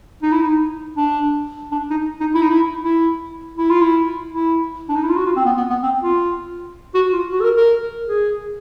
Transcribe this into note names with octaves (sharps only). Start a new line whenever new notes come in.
D#4
E4
D#4
D4
D4
D#4
D#4
E4
D#4
E4
E4
E4
F4
E4
E4
D4
D#4
E4
F4
F#4
F4
C4
B3
B3
B3
C4
F4
F#4
F4
F#4
A4
A#4
A#4
G#4